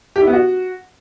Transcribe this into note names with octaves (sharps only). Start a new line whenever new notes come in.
G4
E4
B3
F#4